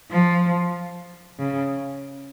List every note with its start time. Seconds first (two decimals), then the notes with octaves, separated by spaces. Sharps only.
0.11 F3
1.39 C#3